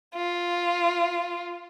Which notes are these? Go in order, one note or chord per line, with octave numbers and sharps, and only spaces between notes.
F4